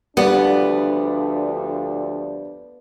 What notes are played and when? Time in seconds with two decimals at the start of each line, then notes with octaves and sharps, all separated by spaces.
0.17 D2 F3 G3 B3 D4 D5